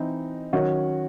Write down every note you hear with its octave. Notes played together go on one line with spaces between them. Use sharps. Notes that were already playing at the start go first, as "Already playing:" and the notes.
Already playing: E3 C4 D#4
D#3 F#3 C#4 F#4